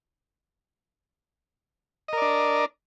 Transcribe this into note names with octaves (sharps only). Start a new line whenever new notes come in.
D4 A#4 D5 D#5